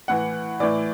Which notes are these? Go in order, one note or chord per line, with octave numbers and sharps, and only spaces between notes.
A2 E3 F#5
A2 E3 D5